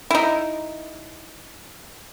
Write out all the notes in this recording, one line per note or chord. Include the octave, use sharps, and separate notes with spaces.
D#4 E4